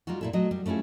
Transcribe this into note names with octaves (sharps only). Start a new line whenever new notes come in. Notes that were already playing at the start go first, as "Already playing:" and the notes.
G3 G#3 D#4 F4 F#4
A#2 E4 A4
F#3 A3 D#5
G3
A3 C#4 E4 F4 G#4